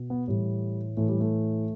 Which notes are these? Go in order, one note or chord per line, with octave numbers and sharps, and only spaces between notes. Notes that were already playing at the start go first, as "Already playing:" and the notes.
Already playing: B2
B3
A2 E3 G3
A2 E3 A3
G3
A3